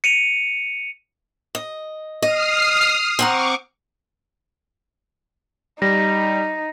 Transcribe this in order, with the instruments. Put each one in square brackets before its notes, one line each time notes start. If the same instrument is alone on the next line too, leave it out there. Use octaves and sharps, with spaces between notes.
[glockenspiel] C#7 D#7 F7
[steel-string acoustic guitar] D#5
[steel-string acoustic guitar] D#5 [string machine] D#6 F6 C7
[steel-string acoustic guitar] C4 F#5 A#5 [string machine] C#6 D6
[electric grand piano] G3 [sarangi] D#4 [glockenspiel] A#6